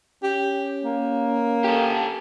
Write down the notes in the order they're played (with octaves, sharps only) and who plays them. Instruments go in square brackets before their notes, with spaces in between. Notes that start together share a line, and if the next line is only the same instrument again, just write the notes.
[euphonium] C#4 [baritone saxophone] G4
[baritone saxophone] A#3
[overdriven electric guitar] G4 A4